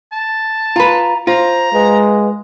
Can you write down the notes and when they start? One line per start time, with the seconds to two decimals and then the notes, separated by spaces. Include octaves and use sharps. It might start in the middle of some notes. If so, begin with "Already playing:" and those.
0.12 A5
0.76 F4 B4 A#5
1.27 F4 C5 A#5
1.73 G#3 B4